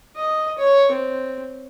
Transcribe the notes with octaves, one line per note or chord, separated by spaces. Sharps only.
D#5
C#5
C4